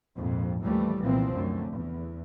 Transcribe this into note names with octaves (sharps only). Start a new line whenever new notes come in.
A#1 F2 G#2
A1 D#2 E3 F3 G3 A3
C2 A#2 E3 F3 B3 C4
F#2 D3 A3
E2